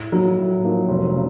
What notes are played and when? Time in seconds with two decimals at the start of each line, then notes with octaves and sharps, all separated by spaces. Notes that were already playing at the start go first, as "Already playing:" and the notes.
Already playing: A2
0.12 F3 F#3 A#3 D#4
0.37 A2
0.63 F3 A#3 D#4
0.88 F1
1.14 C#3